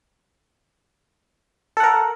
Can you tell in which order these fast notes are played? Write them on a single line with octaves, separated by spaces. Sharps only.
A4 F#5 A#4